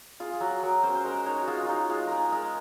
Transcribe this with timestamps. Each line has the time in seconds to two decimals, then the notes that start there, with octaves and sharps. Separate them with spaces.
0.20 F4 G#4
0.33 G#4
0.40 F#3 F#4
0.63 F#3 A#4
0.83 C#4 C5
0.95 C5
1.04 G#3 A#4
1.26 D#4 C#5
1.42 F#4
1.47 G#3 F4
1.63 F4
1.69 D#4 F#4
1.90 G#3 F4
2.07 D#4 G#4 A#4
2.32 G#3 A#4